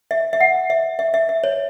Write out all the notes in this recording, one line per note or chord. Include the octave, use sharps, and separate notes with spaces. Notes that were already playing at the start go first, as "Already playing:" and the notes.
E5
E5
F#5
E5
E5
E5
E5
C#5